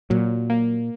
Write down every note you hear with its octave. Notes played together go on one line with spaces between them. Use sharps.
A#2 F#3
A#3